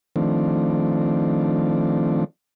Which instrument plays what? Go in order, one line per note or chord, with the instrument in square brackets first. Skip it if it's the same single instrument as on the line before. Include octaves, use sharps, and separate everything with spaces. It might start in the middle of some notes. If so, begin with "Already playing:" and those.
[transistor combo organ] D#3 F3 A3 C4 D4